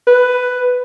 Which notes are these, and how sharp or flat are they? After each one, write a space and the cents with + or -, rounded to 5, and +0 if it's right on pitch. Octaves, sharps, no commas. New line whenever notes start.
B4 +10